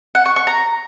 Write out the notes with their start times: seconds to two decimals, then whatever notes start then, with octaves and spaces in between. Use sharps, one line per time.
0.15 F#5
0.26 C#6
0.36 C#6
0.47 A#5